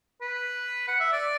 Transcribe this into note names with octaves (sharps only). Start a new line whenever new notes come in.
B4
F#5
E5
D5